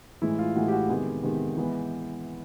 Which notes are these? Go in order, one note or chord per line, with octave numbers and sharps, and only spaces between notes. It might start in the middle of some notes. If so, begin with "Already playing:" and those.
A2 E3 G#3 E4
F4
A2 E3 G#3 F#4
G4
F#4
C3 D#3 G#3 B3 G4
C3 D#3 G#3 B3
E3 G#3 B3